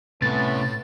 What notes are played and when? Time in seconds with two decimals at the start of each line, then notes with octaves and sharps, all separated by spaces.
0.22 A2 C3 A3 B3 C#4 E4 A6